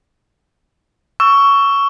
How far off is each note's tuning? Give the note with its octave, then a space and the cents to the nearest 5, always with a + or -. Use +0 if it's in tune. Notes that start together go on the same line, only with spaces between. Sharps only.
C#6 +10 E6 +15